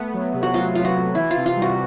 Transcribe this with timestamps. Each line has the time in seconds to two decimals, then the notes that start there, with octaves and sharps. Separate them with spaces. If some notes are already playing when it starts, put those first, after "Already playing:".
Already playing: A3 B3
0.13 F#3
0.34 C3
0.43 F#4
0.54 F#3 F4
0.74 B3 F4
0.85 F#4
0.94 C3
1.15 E3 E4
1.31 F4
1.37 C3
1.46 F4
1.57 G3
1.62 F#4